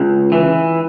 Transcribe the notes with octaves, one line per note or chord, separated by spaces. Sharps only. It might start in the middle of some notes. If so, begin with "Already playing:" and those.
Already playing: C#2
E3